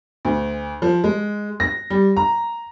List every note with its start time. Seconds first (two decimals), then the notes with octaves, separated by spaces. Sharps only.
0.25 D2
0.82 F3
1.04 G#3
1.60 A#6
1.90 G3
2.16 A#5